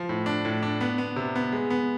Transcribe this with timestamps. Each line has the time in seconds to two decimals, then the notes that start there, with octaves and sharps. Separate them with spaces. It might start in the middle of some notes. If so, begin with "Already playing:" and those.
Already playing: F3
0.09 A2
0.26 D4
0.45 A2
0.63 D4
0.81 B3
0.98 B3
1.16 C3
1.36 B3
1.52 G#3
1.70 B3